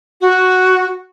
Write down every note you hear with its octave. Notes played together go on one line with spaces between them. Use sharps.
F#4